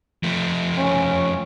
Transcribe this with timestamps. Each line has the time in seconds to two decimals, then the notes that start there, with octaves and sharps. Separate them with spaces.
0.23 F3 A3
0.78 C#4